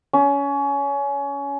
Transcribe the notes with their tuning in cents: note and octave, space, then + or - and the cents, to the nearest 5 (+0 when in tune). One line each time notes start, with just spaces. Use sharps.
C#4 +25